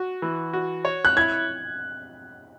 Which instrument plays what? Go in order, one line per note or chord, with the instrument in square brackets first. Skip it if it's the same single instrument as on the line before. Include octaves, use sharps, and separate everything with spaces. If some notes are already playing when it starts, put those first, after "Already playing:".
Already playing: [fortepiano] F#4
E3
F#4
C#5
[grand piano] F#6
[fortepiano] E4 [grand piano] G#6